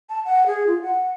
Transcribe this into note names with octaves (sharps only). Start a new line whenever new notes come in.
A5
F#5
G#4
F4
F#5